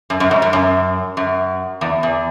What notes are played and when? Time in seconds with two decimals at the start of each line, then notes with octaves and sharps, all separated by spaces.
0.10 F#2
0.20 F#2
0.31 G#2
0.42 F#2
0.53 F#2
1.17 F#2
1.81 E2
2.03 E2